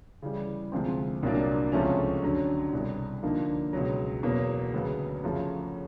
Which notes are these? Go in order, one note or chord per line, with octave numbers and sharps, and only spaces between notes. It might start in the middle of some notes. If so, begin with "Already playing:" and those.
C#3 E3 G3
D2 C3 F3 G#3 C4
C2 A#2 F#3 A#3 D4
C#2 C3 F3 A3 C#4
F#2 D3 F#3
C2 B2 G3
D3 F3 A#3 D#4
C#2 B2 F#3
E2 B2 F#3 A#3
D2 C#3 F#3 B3
F#2 C#3 F3 A3